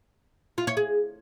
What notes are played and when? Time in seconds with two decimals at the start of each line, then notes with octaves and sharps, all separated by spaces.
0.58 F4
0.67 C#5
0.77 G#4